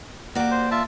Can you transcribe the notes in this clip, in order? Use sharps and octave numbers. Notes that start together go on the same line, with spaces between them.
A#3 F#4 G4 D5
C5
F4 E5 A5